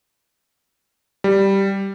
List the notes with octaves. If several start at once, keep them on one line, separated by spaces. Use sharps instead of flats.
G3